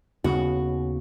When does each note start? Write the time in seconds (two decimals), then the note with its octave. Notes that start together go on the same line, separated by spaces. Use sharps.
0.24 D#2 C#3 B3 F#4